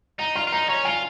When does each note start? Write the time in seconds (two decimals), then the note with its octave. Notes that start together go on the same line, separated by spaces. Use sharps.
0.19 D#4 A#5
0.36 F4 C6
0.47 F4
0.52 D#4 A#5
0.69 C#4 A#5
0.85 F4 G#5